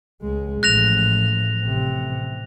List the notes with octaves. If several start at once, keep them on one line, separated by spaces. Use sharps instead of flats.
C#2 G#3
A1 F3 F#6 A#6 F7
A1 C3